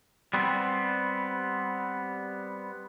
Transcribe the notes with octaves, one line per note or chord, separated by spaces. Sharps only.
G3 B3 C4